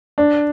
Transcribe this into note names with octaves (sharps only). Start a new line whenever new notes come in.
D4